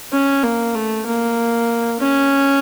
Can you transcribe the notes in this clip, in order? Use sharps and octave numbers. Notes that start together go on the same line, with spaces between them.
C#4
A#3
A3
A#3
C#4